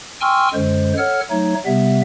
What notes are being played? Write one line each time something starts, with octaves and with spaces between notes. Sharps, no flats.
G5 G#5 C6 C#6 E6 F6
F#2 D3 G#3 C5
A4 C#5 F#5 F6
F#3 A3 D#4 C#5
C3 G3 B3 E5